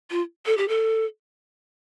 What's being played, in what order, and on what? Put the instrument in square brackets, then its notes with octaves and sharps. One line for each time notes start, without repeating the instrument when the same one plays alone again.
[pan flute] F4
A4
G4
A4